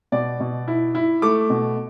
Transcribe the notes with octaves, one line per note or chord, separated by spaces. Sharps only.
B2 D5
B2
E4
E4
A3 D6
B2